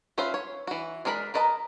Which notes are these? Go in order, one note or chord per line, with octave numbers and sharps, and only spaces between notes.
C#4 F4 B4 C5 E5
C#5
E3 F#4
G#3 D4 A#4 C5 B5
A#4 B4 D#5 A5 A#5